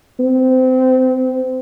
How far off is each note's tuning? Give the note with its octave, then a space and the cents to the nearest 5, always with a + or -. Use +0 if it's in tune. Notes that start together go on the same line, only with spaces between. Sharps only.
C4 -25